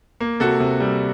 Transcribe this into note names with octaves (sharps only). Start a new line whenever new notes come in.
A#3
C3 F#4 A4
C3
G3